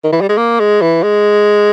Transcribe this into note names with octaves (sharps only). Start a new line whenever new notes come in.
D#3
E3
G3
G#3
A#3
G#3
E3
G#3